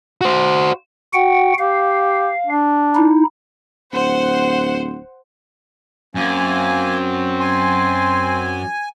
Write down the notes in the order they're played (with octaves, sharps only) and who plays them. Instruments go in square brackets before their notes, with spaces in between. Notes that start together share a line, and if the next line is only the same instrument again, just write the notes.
[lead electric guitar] F#4 C5
[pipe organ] F#4 F#5 G5
[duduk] G4 [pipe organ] F5
[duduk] D4
[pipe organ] D#4 E4
[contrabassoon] D1 [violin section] C5 F#5
[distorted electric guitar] F#2 [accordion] A#3 G#5 [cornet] C4
[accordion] G#5 [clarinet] C6